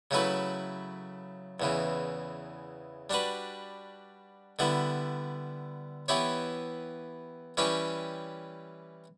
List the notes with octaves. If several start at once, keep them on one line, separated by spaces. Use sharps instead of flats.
C#3 F#3 A3 E4 B4
E2 C#3 E3
G3 D4 F#4 B4
D3 G3 B3 E4
E3 B3 E4 G4 C#5
E3 G3 C#4 G4 C#5